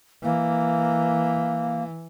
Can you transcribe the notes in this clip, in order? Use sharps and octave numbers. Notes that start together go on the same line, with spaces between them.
E3 A#3